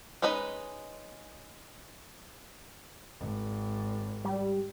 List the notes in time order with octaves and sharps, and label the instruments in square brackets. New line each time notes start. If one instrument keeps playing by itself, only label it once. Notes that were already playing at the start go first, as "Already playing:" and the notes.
[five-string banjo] G#3 C#4 D#4 B4 D#5
[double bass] G#1
[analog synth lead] G3